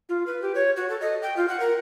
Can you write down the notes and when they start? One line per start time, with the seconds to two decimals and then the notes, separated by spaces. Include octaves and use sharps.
0.09 F4
0.27 B4
0.42 G4
0.55 C#5
0.77 F#4
0.89 A4
1.01 D#5
1.22 G5
1.37 F4
1.48 F#5
1.60 A#4